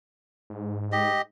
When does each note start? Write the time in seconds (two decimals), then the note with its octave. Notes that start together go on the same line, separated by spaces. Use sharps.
0.50 G#2
0.92 G4 D#5